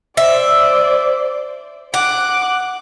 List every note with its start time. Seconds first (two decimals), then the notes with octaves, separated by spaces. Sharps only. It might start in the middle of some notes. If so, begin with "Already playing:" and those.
0.17 C5 D5 E5
1.94 F#5 D6 F#6